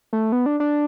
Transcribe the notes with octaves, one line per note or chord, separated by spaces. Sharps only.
A3
B3
D4
D4